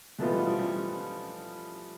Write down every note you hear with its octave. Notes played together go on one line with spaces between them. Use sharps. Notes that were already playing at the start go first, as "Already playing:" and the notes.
E2 B2 A3 B3 F4
G3
F3
G3